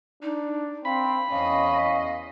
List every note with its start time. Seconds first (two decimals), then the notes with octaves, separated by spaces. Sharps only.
0.23 D4 D#4
0.85 C4 F5 B5
1.31 E2 C#4 D#5 F5